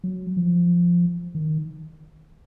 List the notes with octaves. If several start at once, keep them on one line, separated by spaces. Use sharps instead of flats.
F#3
F3
D#3